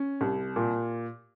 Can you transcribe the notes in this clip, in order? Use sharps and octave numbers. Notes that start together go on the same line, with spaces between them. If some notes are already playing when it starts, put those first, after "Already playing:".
Already playing: C#4
C2
A#2